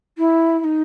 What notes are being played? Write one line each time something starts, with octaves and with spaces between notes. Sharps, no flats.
E4
E4
D#4